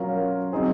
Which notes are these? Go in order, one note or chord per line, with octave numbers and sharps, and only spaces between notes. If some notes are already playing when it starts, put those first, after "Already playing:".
Already playing: F#3 C#4 F4 A#4
F#3 C4 D#4 G#4 C5